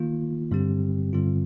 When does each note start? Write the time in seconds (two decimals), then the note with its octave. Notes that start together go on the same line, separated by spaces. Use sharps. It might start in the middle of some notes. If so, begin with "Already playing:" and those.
Already playing: D#3 A#3 F4
0.51 G2 D3 G3 C4 G4
1.13 G2 D3 G3 C4 F4